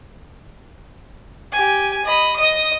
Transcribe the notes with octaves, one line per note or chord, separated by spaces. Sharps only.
G4 G#5
D#5 B5
D#5 D#6